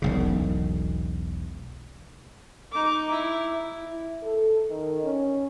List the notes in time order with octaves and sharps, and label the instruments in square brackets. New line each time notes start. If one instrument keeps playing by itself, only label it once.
[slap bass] E1 B1 C#3
[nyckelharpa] D#4 D6
E4
[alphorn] E4
A4
D#3
C#4